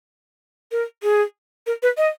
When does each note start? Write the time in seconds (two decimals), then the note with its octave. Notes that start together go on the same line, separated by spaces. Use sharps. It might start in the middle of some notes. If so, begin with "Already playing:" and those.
0.72 A#4
1.03 G#4
1.67 A#4
1.83 B4
1.97 D#5